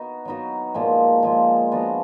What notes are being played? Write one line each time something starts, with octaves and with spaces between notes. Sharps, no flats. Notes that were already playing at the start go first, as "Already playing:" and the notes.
Already playing: B3 D#4 F#4
F#3 B3 D#4 F#4
A#2 F3 G#3
A#2 F3 G#3
F3 B3 D4 F#4